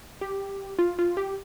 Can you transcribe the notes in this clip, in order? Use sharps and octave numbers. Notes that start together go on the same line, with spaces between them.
G4
F4
F4
G4